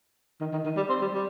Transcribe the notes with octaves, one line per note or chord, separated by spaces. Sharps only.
D#3
D#3
D#3
G3
C4
G3
G3